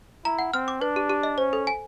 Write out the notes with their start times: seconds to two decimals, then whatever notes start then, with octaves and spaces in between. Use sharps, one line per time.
0.25 E4 A#5
0.39 F#5
0.53 C4 F6
0.68 D6
0.81 D4 B4
0.96 G4
1.10 G4
1.23 D#5
1.38 C#4 C5
1.53 A4
1.67 G#5